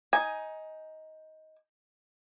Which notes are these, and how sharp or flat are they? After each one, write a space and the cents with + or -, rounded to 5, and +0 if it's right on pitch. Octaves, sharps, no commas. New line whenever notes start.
D#4 +15 G#5 +0